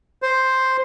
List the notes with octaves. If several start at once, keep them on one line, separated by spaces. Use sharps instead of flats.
C5